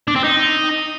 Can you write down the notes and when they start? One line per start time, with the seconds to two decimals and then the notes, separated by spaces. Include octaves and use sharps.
0.08 D4
0.16 C4
0.24 D#4